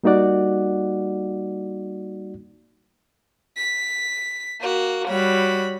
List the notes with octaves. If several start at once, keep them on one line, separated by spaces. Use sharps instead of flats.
G3 A#3 D#4 F#4 D5 F#5
B6
A#3 F#4
G3 F#4 C#5 B5